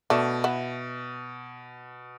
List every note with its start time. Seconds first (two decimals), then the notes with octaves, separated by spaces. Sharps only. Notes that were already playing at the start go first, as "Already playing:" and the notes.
0.10 B2 A3 D4
0.44 B3 E4